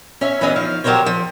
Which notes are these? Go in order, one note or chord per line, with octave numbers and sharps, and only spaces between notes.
C#4 C#5 E5
E3 F#3 B3 C#4 G#4 D#5
D#3 F3 F5
F3 F#3 G4 A#4 C5 C#5
F3